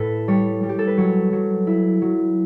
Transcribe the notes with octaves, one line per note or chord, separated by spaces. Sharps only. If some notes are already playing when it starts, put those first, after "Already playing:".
Already playing: A2 A4 B4
G3 C#5
G3
G4
A4
B4
F#3 C#5
F#3
E4
F#3